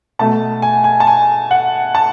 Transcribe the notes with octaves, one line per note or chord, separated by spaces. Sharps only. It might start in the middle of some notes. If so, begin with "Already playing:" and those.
B2 A3 A5
G#5
G#5
A5
G#5
F#5
A5